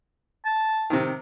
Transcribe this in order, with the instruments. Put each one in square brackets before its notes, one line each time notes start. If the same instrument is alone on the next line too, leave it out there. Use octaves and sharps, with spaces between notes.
[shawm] A5
[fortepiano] C3 D#3